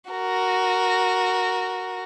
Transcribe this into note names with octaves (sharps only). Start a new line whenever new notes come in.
F#4 A#4